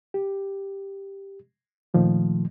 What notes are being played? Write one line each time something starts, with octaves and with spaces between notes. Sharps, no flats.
G4
A#2 D#3 F3 A3